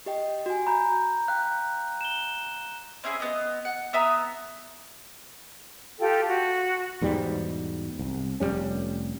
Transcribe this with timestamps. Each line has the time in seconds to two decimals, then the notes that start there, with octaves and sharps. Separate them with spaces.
0.06 G4 D#5 G5
0.46 F#4 G#5
0.67 A#5 B5 G6
1.28 F5 G5 F#6
2.01 E7 G7
3.04 C4 C#4 E4 G#4
3.20 B3 D#5
3.65 F#5
3.93 B3 E5 A#5 D#6
6.00 F4 G4 A4 G5
6.28 F#4
7.01 E2 G#2 B2 G3
7.99 C2
8.40 F1 G#2 G3 C#4